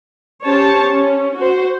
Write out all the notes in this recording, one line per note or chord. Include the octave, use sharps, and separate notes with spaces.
C#4 G4 C5 C#5 A5
C#4
F#4 C5